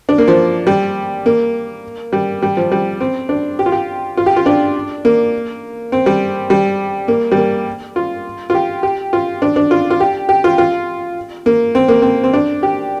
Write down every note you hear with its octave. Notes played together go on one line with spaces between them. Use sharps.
D4
A#3
F3
G3
A#3
G3
G3
F3
G3
C4
D4
G4
F4
G4
F4
G4
F4
D4
A#3
C4
G3
G3
A#3
G3
A#3
F4
F4
G4
G4
F4
D4
D4
F4
F4
G4
G4
F4
F4
A#3
C4
A#3
C4
C4
D4
G4